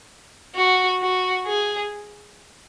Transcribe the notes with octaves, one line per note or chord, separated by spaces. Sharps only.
F#4
F#4
G#4